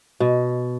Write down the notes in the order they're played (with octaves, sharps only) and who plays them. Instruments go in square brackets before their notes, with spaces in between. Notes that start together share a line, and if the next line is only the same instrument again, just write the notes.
[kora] B2